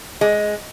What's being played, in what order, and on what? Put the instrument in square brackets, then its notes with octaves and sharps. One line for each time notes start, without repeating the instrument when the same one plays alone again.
[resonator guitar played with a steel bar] G#3